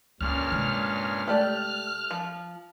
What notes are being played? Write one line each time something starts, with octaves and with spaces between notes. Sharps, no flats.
C#2 G2 A#2 C#4 F6
C3 G#3
A3 G4 D5 F#6
F3